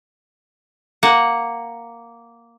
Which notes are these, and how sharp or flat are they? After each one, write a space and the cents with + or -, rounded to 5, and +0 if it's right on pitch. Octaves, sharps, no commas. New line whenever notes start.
A#3 +0 F#5 +0